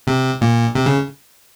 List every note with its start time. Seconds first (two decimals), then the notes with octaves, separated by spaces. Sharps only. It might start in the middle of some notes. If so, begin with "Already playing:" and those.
0.07 C3
0.41 A#2
0.75 C3
0.86 C#3